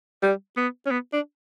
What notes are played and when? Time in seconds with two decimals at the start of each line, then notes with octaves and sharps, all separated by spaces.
0.22 G3
0.57 B3
0.86 C#4
0.91 B3
1.13 D4